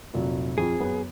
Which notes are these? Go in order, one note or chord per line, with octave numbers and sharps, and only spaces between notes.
F1 A#2 F#3
F2 C4 F4 G#4
F#2 B3